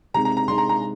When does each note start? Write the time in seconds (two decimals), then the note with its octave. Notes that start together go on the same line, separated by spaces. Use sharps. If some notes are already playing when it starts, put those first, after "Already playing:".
0.14 C3 G#3 D#4 A#5
0.25 A#5
0.37 A#5
0.48 C3 G#3 D#4 C6
0.58 A#5
0.69 A#5